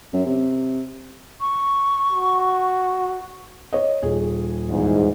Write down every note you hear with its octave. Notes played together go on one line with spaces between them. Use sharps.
F#2
C3
C#6
F#4
C#5 D#5
D#1 G#4
E2 G#2